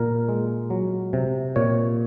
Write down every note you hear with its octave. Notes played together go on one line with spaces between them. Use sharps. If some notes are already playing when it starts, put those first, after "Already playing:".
Already playing: A#2 A#4
G#3
F#3
C3
A#2 C#5